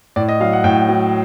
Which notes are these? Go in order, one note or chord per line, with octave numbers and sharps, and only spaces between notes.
A2 D5
D#5
F#3 F5
F#5
A2 G5
F#3